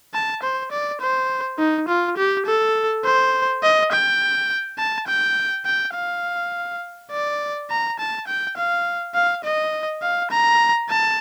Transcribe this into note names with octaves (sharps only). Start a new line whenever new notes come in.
A5
C5
D5
C5
D#4
F4
G4
A4
C5
D#5
G5
A5
G5
G5
F5
D5
A#5
A5
G5
F5
F5
D#5
F5
A#5
A5